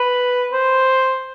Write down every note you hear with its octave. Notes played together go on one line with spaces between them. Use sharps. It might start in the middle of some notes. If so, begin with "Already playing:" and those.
Already playing: B4
C5